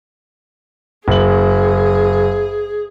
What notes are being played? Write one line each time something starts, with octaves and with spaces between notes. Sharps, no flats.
F#1 G#4 F#7